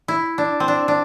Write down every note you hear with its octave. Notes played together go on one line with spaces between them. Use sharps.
E4
D4
C4
D4
D4